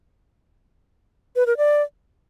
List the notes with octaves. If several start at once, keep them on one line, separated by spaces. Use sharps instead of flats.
B4
A#4
D5